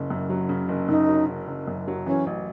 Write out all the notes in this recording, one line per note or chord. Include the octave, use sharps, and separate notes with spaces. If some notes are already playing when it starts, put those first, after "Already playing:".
Already playing: F#1 C#3
F#2
F#3
C#3
F#1
F#2 D#4
F#3
C#3
F#1
F#2
F#3
E3 C#4
A1